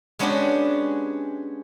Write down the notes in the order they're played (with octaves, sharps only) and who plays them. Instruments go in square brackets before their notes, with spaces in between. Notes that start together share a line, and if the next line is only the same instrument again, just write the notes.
[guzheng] G#3 B3 C#4 D4 F#4 G4